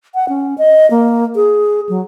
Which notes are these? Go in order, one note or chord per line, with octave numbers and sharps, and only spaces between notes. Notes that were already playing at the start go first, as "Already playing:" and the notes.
F#5
C#4
D#5
A#3
G#4
F#3